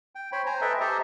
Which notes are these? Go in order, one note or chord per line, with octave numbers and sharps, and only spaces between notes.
G5
C5 C#5 G5 B5
C5 G#5 A#5
A4 B4 D#5 E5 G5
G4 A4 C5 D#5 E5 A#5